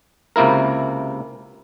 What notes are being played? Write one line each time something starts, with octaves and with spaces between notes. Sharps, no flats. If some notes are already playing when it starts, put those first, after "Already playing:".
C#2 C3 A#3 E4 A#4